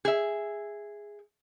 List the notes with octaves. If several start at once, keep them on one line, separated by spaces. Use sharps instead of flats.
G#4 E5